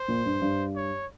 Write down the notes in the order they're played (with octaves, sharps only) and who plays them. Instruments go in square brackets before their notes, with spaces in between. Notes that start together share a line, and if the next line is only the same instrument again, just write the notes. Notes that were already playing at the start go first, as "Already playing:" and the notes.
Already playing: [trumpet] C5
[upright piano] A#2
G2
G2
[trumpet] C#5